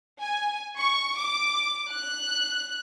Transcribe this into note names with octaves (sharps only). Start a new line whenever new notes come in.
G#5
C#6
D6
F#6